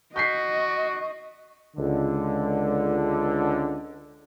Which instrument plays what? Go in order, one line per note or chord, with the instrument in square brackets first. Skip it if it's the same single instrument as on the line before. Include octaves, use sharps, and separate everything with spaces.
[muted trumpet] F#4 [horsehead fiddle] D#5 [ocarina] C#6 [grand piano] G6 B6 C7
[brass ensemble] C#2 D3